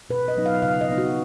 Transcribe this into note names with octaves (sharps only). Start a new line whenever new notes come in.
B2 B4
D#5
F#3 B3 D#4
F5
C#3 F5
D#5
F3 B3 D#4
F#4